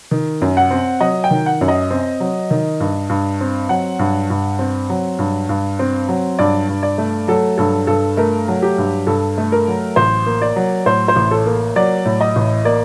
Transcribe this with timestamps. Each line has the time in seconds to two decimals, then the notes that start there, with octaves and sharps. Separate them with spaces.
0.11 D#3
0.41 F#2
0.57 F#5
0.71 C4
1.01 F#3 D#5
1.24 G5
1.31 D#3
1.46 F#5
1.61 F#2
1.68 D#5
1.91 C4
2.20 F#3
2.51 D#3
2.80 G2
3.10 G2
3.41 C4
3.69 F#3 F#5
3.99 G2
4.30 G2
4.59 C4
4.89 F#3
5.19 G2
5.49 G2
5.79 C4
6.09 F#3
6.39 G2 D5
6.69 G2
6.83 D5
6.98 A3
7.28 F#3 A4
7.58 G2 A4
7.87 G2 A4
8.17 A3 A#4
8.48 F#3
8.63 G4
8.78 G2
9.07 G2 A4
9.38 A3
9.52 A#4
9.68 F#3
9.96 A1 C5
10.26 A#3
10.42 D5
10.56 F#3
10.86 A2 C5
11.08 C5
11.16 A1
11.31 A4
11.46 A#3
11.76 F#3 D5
12.05 A2
12.21 D#5
12.36 A1
12.65 A#3 D5